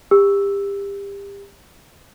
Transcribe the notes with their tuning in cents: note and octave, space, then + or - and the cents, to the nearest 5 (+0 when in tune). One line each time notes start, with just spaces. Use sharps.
G4 +30 E6 +0